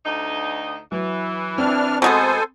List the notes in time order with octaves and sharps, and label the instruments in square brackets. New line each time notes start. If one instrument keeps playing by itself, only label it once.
[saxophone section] D2 D#4
[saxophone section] E3 [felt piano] F#3
[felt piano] C4 [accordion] D4 F6
[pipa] B2 G#3 B3 [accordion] A4 C5 G#5